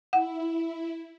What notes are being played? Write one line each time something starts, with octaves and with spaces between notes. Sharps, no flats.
E4 F#5